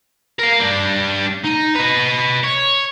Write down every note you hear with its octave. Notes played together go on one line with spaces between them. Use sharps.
A#4 F5
G3 D4
D#4
B4 D#5
C#5